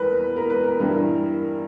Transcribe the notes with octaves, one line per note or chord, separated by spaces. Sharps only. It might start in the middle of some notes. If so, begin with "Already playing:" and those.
Already playing: E2 G3 A#4 B4
A#4
B4
A#4
G2 E3 G3 A#4